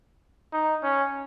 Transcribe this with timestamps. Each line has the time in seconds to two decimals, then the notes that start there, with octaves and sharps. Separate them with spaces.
0.52 D#4
0.83 C#4